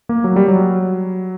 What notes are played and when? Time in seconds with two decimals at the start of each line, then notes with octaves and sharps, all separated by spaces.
0.09 A#3
0.24 F#3
0.36 G3
0.48 F#3